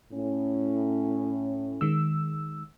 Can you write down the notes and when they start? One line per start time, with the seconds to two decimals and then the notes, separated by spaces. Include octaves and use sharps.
0.12 A2 C#4
1.81 D#3 G#3 E6